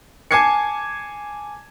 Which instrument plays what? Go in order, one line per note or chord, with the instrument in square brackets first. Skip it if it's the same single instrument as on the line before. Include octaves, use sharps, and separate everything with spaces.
[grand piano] G#5 A5 D6 G#6 C7 C#7